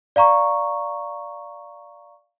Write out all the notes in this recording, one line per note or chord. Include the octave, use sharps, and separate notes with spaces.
D5 F5 A#5 C#6